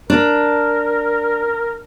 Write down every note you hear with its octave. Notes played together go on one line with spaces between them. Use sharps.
D4 A#4